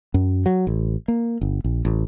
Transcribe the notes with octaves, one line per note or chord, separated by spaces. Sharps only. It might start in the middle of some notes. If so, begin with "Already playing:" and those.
F#2
F#3
A1
A#3
G1
A#1
A1